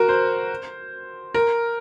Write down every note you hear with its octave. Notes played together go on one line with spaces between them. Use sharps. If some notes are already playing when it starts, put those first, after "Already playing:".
Already playing: F#4 A#4
C5
A#4